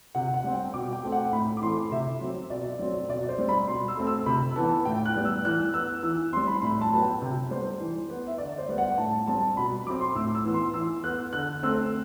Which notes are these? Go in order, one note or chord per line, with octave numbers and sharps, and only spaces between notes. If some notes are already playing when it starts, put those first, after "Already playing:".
C3 F#5
F#5
G3 C4
G5
B2 D6
G5
A3 C4
F#5
A2 B5
D6
E3 A3 C4 C6
C3 E5
F#3 C4
B2 D5
F#3 C4
B2 D5
C5
G3 C4
B5
B2 C6
E6
A3 C4
E6
C3 B5
E3 B3 A5
A2 G5
F#6
G3 B3
E6
E3 F#6
B3 E6
E3 E6
G3 C4 C6
B5
A2 B5
A5
F#3 B3
G5
C3
G3 B3 C5
E3
B3
E5
D3 D5
C5
G3 B3
F#5
A2 A5
G3 C4 A5
B2 B5
F#3 C4 D6
C6
A2 E6
E6
E3 B3
C6
E3 E6
B3 F#6
D3 F#6
A3 C4 E6